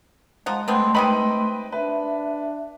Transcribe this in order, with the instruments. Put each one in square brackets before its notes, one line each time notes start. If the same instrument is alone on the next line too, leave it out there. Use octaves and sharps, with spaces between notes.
[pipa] F3 F#5 [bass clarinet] G#3 [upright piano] A#5
[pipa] D3 B3 C4 [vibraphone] A3 C6
[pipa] C3 D#3 B5 [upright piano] B4 D#5 G5
[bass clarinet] D4 [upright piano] B4 [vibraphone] E5